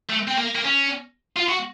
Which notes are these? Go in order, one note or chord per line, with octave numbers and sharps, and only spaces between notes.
A3
C4
A#3
A#3
C#4
F4
F#4